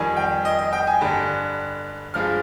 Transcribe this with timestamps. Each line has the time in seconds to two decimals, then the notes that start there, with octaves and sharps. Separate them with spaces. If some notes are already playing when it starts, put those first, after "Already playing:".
Already playing: F2 D#3 G3 G#5
0.17 G5
0.45 D#5
0.58 D#5
0.73 G5
0.87 G#5
1.01 G2 D3 G3
2.14 G2 F3 G#3 F6